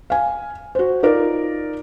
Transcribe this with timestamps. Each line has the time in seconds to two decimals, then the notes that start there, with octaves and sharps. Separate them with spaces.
0.10 F5 G#5
0.75 F#4 C5
1.03 D#4 F4 A#4 D5